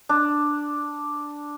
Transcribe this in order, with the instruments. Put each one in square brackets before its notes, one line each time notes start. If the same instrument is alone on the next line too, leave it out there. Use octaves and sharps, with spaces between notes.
[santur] D4